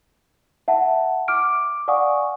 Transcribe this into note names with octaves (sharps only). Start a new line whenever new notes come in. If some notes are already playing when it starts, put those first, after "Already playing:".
E5 F#5 A5
D6 F6 D7
D5 F5 F#5 G#5 C#6 D#6